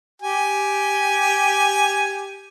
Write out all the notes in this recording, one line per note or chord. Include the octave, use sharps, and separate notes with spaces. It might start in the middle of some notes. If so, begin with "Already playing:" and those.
G4 G#5